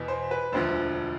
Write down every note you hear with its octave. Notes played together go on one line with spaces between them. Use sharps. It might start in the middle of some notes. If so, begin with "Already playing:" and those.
Already playing: E2 B2
C5
B4
E1 D2 D3 F3 C5